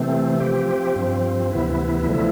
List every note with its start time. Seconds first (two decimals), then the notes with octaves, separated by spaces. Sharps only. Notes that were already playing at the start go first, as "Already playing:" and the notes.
Already playing: C3 E3 A3 C4
0.40 F3 C4 G4
0.96 G2 F3 C4
1.52 D2 C3 E3 B3 E4
2.09 D3 F3 A3 E4